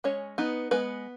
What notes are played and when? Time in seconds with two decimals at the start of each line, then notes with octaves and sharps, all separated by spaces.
0.04 G#3 C#4 C#5
0.38 B3 D#4 B4
0.71 G#3 B3 B4